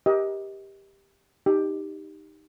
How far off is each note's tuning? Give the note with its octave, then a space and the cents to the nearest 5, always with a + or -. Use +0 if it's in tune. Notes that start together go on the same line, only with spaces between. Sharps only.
G4 +5 A#4 +40 D#5 +30
D#4 +0 G4 +0